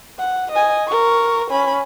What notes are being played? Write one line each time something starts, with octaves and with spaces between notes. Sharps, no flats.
F#5
D#5 G#5
A#4 C#6
C#4 B5